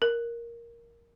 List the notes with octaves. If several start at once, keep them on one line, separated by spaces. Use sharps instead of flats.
A#4